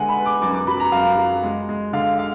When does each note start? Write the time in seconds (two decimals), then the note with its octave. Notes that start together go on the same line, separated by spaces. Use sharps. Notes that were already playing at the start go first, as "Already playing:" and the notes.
Already playing: D3 G#3 B3 F#5 G#5
0.09 B5
0.17 B3
0.26 D6
0.42 F#2 D6
0.54 D6
0.67 F#3 B5
0.80 A#5
0.92 F#2 F5
1.17 F#3
1.43 G#3
1.69 G#3
1.93 D3 F5
2.19 F5